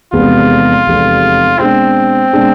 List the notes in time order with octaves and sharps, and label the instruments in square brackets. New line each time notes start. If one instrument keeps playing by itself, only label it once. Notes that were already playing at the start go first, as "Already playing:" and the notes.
[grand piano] F1 E2 C3 G#3 B3 [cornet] F4
[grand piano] F1 E2 C3 G#3 B3
[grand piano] B2 G#3 D4 [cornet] C4
[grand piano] B2 G#3 D4